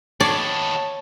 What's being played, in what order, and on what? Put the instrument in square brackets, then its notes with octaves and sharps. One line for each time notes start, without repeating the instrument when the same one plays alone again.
[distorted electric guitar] D#2 B3 [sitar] C#5 [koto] D5 [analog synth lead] A5